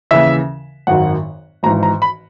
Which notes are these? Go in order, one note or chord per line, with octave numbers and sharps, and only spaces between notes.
D#2 C#3 E3 E5
G#1 F#2 D#3 F#5
G#1 G#2 E3 A#5
A#5
B5